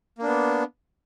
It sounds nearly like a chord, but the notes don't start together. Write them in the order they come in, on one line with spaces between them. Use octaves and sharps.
A#3 D4 B3